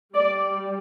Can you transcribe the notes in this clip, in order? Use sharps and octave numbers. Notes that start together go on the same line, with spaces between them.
G3 D5